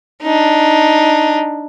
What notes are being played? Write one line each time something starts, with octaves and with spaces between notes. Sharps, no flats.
D4 D#4